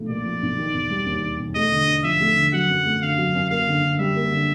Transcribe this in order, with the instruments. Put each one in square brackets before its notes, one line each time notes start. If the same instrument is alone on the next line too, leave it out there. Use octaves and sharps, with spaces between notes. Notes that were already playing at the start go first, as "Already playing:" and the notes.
Already playing: [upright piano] B1 F3 A3
[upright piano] A#2 [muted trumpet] D5
[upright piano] F3
B1
D#3
E1
G3
D#2
D#3
E1
[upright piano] A3 [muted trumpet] D#5
[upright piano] D3
D4
[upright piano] F3 [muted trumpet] E5
[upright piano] A3
D3
[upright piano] F#3 [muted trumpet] F#5
[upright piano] F#2
A3
[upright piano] D3 [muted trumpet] F5
[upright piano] F#3
F#2
[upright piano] A#3 [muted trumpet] F5
[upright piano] D3
D3
[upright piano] G3 [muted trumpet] E5
[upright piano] A#3
D3